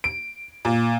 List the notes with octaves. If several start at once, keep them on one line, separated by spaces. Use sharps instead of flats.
D7
A#2